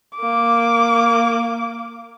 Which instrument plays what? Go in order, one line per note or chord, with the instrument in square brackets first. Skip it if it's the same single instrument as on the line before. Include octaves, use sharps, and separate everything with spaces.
[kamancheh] A#3 D6